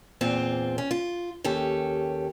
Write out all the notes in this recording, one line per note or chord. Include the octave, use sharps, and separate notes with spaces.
E2 A#2 C4 F4
C#4
F4
D#2 C#4 G4 A4